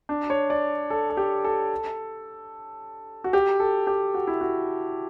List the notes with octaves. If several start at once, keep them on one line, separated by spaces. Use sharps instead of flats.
D4
C#5
D5
A4
A4
G4
A4
F#4
G4
A4
G4
F#4
E4
F#4